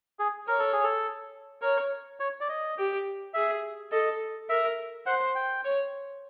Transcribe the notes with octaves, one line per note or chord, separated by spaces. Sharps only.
G#4
A#4 C#5
A4
G#4
A4
A#4 C#5
C#5
D5
D#5
G4
G#4 E5
A4 D#5
A#4 E5
C5 F#5
G5
C#5